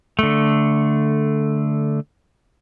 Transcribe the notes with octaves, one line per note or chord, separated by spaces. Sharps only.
D3 A3